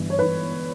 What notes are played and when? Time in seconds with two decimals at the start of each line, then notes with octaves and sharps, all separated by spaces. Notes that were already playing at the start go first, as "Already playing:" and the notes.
Already playing: G1 G2 E3
0.10 C#5
0.19 E3 B4